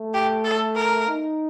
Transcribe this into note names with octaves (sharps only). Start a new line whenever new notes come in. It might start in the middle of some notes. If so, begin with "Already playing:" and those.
Already playing: A3
G4
A4
A#4
D#4